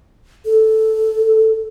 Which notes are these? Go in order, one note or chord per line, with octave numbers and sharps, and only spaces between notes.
A4